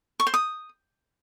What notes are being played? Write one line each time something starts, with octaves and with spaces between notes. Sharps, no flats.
C#6
C5
D#6